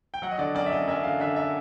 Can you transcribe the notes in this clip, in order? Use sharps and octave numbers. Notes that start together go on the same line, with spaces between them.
G5
F#3 F#5
D#5
D3 D5
F#2 D5
E5
F#2 D#5
F#2 E5
D3 F5
D3 E5
E5